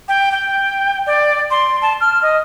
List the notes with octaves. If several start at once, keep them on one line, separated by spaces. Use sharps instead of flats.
G5
G5
D5
C6
A5
F6
D#5